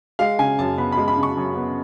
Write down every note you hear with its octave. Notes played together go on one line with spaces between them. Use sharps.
G#3 F5
C#3 G#5
F#2 A5
B3 B5
G#3 B5
B5
C#3
C#6
F#2
B3